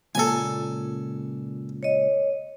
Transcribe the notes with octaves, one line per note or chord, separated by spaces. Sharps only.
C#2 A#2 A4 G#5
C#5 D#5